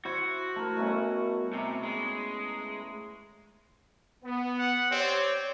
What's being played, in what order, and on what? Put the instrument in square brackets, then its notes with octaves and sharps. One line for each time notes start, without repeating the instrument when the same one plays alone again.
[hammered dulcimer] E4 C5 [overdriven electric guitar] F#4
[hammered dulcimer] A3 E4 A#4
[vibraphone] G3 A#4 D#5 [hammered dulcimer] A3 B3 C#4
[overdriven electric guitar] C3 [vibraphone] A#5 C#6
[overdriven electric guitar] G#3
[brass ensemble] B3
[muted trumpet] F#5
[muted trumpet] C4 [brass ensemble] G4 C#5 D5